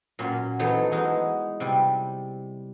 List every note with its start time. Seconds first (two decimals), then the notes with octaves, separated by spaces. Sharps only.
0.19 A#2 F#3 C#4 C6
0.59 E3 F#3 A3 B3 D#4 C5
0.92 E3 G#3 D#4 F#4
1.60 C3 G3